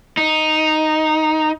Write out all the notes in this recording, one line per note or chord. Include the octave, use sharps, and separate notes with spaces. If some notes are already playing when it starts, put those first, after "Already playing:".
D#4